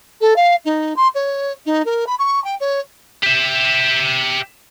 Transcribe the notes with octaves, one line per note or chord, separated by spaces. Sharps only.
A4
F5
D#4
C6
C#5
D#4
A#4
B5
C#6
G5
C#5
G4 E5